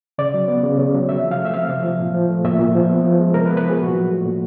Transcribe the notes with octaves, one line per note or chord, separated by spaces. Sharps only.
C#3 D5
F#3
B3
C#3
C#3
F#3
C3 E5
F3
F5
A3
E5
C3 F5
C3
F3
A#2
F3
A3
A#2 E5
A#2
F3
B3
F3
G#3
C3 A#4
B4
B3
B4
F3 G#4
A#2 F#4
F#3
A3
A#2